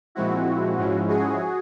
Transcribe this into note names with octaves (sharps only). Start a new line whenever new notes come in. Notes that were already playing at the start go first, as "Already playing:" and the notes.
A#2 F3 G#3 C4 E4 F#4
G#2 F3 G#3 C#4 E4
F#4 G#4